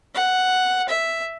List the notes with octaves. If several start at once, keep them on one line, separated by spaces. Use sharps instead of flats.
F#5
E5